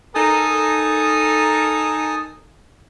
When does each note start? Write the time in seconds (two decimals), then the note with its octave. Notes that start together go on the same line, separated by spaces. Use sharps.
0.15 D#4 A4 A#4 G#5 A5 D#6